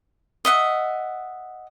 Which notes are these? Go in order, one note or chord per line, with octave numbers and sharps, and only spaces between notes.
D#5 E5 F#5